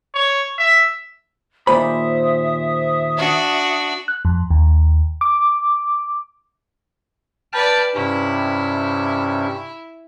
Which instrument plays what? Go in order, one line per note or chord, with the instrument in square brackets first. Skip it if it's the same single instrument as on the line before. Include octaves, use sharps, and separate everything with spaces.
[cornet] C#5
E5
[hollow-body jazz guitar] D#2 A#2 B5 [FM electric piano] C5 [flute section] E5 D#6
[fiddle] D4 F#4
[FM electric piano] F#6
F2
D#2
D6
[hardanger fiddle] B4 D5 [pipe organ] G5 A5 F6
[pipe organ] G2 C3 C#4 [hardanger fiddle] E4